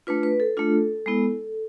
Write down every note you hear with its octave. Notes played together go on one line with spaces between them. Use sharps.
A3 D4 F4 B4
B4
A4
A3 D4 F4
G#3 B3 E4